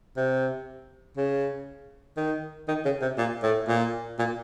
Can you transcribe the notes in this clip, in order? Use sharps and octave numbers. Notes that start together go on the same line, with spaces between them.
C3
C#3
D#3
D#3
C#3
C3
A#2
A2
A#2
A#2